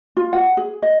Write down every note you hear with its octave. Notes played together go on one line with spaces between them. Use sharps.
F4
F#5
G#4
D#5